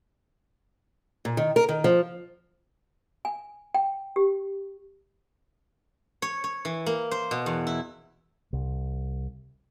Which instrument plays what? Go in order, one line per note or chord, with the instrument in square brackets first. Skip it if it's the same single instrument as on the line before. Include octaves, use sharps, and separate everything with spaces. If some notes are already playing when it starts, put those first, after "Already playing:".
[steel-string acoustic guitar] A#2
D#3
A#4
D#3
F3
[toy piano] G#5
G5
G4
[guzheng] C#5
C#5
E3
A#3
C5
B2
E2
E4
[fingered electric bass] C2